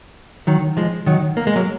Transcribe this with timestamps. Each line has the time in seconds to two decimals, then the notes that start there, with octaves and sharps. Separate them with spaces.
0.47 D#3 F#3
0.77 F3 G#3
1.06 D#3 F#3
1.37 A#3
1.47 G#3
1.56 F#3 A#3